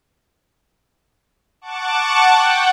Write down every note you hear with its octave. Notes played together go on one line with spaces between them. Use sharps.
F#5 A5 C#6 D6
F#5 G5